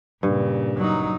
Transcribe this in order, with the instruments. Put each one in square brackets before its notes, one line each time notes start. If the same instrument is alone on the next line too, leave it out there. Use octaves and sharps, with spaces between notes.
[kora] G2 [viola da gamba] A#2 C#3
[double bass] F#3 D#4